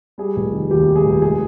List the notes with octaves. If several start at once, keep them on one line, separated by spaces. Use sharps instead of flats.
G3 G#4
F1
D#3
D#2 G4
G3
G#4
F1
G#3 G#4